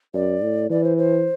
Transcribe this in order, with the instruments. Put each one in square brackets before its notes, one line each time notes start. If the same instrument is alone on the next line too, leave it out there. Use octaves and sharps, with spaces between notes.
[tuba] F#2 [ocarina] D5
[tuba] A2
[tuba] E3 [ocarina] D5
[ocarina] C5
C5